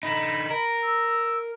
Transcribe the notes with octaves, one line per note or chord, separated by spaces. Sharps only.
D3 D#4 B5
A#4
E6